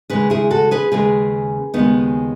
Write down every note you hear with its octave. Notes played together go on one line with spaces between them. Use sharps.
D#2 C#3 G#3 G#4 B4
E4 G#4
F#4 A4
G#4 B4
D#2 C#3 G#3 G#4 B4
D#2 C#3 G#3 B3 D#4